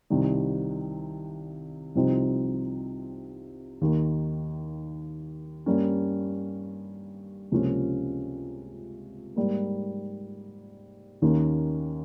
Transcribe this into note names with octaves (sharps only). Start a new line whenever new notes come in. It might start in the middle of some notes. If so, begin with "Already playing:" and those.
C2 C3 D#3 G3
C2 C3 F3 C4 D#4
D#2 D#3 A#3
G2 G3 A#3 C#4
C#2 C3 F3 A#3 C#4
G#2 G3 A#3
D#2 D#3 A#3 C#4